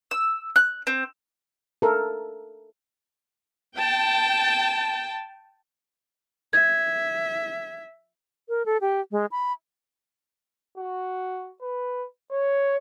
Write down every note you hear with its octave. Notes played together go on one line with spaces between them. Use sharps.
E6
F#6
C4
A4 A#4
G5 A5
E5 G#6
A#4
A4
G4
G#3
B5
F#4
B4
C#5